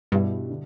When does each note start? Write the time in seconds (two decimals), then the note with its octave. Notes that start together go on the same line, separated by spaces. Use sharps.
0.12 G2 B2 G3 E4 G4 E5
0.50 D3